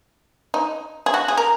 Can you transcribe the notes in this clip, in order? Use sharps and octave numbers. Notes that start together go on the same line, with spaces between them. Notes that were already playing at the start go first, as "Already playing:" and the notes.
D#4
G#4
F#4
G#4
A#4